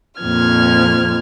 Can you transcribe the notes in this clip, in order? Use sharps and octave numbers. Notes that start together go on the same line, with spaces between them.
F2 A#2 F3 F6 G#6